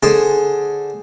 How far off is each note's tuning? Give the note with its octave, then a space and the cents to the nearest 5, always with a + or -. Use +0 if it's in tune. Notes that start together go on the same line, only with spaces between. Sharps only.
D3 +0 G#4 +0 C5 +0